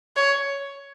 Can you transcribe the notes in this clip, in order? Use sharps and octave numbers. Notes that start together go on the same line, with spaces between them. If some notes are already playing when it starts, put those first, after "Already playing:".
C#5